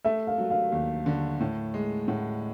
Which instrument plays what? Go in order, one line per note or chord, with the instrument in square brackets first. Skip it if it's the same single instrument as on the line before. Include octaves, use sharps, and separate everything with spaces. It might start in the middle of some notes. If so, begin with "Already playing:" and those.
[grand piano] A3 [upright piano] E5
[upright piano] F5
[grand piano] F#3
[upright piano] F5
[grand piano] D#2
D3
A2
G#3
[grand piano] A2 [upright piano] F#5